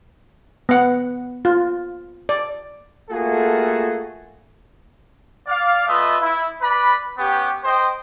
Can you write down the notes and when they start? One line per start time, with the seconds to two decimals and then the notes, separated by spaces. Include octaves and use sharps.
0.69 B3 F#5
1.45 F4
2.29 D5
3.10 A3 A#3 F4 F#4 G#4 A4
5.47 D5 F5
5.88 A3 F4 B4 D#5 E5
6.22 E4
6.61 B4 D5 B5
7.18 B3 C#4 G4
7.64 C5 D#5 G5